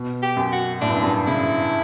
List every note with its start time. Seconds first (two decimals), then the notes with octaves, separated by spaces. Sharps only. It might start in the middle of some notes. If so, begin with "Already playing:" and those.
Already playing: B2
0.23 G4
0.36 F#2
0.52 F#4
0.81 A2 D4
0.89 G2
0.96 F#2
1.03 G2
1.26 C#3 E4